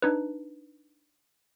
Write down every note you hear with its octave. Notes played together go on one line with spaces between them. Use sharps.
D4 D#4 B4